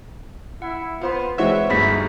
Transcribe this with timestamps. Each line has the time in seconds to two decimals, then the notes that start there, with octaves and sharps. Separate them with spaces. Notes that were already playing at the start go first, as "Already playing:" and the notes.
0.62 E4 F#5
1.01 B3 F4 C5 C6
1.38 E3 G#3 C4 F#4 B4 C#5 E5 F#5
1.70 G1 D2 G2 D#4 F#4 G#4 B5